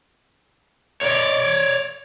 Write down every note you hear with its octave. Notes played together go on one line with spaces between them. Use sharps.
C#5 D5